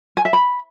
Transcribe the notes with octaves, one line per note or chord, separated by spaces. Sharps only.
G#5
E5
B5